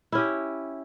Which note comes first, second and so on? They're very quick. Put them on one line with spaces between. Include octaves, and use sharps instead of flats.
E4 C#4 G4